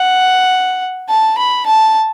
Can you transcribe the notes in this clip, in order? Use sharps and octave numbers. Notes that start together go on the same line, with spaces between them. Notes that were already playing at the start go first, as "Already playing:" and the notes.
Already playing: F#5
A5
B5
A5